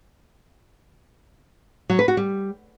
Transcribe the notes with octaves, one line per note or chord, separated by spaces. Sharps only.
F#3
B4
F#4
G3